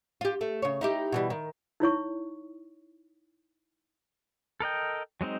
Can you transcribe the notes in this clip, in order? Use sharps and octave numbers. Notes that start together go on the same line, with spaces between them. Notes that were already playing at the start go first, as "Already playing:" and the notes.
F4 G4
A3
C#3 C#5
D#4 E4 G4
B2 E3 G3
D#3
D#4 E4 C#5 C#6
A4 A#4 D#5 G5
F#3 G#3 C4 D#4